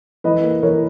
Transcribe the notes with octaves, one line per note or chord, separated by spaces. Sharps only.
E3 B4 D#5
A#3
E3 A#4 C#5